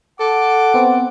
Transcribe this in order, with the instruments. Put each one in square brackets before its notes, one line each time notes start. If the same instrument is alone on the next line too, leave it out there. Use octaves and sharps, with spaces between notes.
[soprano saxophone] A4 [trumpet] F#5 [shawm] D6
[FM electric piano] B3 C4